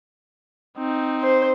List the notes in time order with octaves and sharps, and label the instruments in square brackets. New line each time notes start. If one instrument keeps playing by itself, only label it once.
[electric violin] C4 D#4
[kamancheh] C5